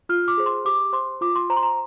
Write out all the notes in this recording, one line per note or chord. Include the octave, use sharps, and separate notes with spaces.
F4 F6
D6
G#4 C5
C6
G4 D6
C5 C6
F4 D6
C6
C5 A#5
C6
A#5